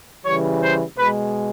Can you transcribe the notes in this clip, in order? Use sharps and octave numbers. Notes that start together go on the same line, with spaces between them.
C#3 E3 G3 C#5
C5
B2 G#3 B4